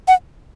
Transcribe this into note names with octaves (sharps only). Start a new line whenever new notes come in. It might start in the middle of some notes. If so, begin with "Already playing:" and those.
F#5